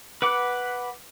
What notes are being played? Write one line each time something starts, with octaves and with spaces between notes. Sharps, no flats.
B4 F#5 D6